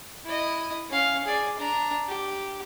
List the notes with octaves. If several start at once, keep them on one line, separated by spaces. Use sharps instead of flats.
E4 D#5
C#4 F5
G#4 D5
D4 A#5
G4